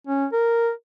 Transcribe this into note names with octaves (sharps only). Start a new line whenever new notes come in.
C#4
A#4